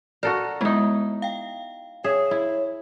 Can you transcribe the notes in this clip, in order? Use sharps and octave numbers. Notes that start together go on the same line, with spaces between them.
F#4 A4 A#4 D5
G#3 B3 D#4 E4
F5 G5
G#4 C#5 E5
E4